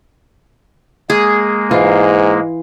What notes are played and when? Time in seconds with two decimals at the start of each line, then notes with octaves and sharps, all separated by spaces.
1.10 G#3 A#3 G#4
1.71 G#2 E3 F4